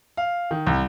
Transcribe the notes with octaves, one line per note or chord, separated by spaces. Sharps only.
F5
D#3
C2